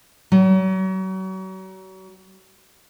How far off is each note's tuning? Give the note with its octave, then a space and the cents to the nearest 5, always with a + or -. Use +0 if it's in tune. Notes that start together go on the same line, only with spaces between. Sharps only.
F#3 +35